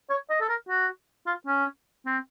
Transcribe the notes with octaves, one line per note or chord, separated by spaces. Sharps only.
C#5
D#5
A4
A#4
F#4
F4
C#4
C4